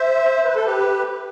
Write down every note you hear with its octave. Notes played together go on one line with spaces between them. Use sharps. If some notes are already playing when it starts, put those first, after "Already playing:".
Already playing: C5 E5
B4
A4
G4 B4